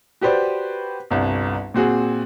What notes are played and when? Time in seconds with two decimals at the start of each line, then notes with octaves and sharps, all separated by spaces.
0.21 F#4 G4 B4 C5 D5
1.10 G1 C2
1.74 A#2 C4 F#4 G#4